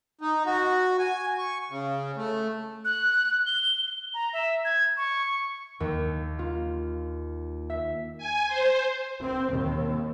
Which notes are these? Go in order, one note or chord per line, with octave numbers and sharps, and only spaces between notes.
D#4
F#4
G#5
C#6
C#3
A3
F#6
G7
A#5
E5
G#6
C#6
D#2
F4
E5
G#5
C5
C4
D#2